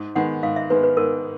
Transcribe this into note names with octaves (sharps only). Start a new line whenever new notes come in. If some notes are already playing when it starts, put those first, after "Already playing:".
Already playing: G#2
D#3 G#3 B3 F#5
G#2 F5
E5
D#3 G#3 B3 B4
B4
G#2 A#4